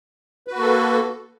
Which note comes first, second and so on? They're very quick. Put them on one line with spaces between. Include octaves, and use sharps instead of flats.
B4 F#4 A#3 A4